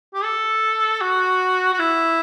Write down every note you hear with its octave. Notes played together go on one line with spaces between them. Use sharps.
G4
A4
F#4
F#4
E4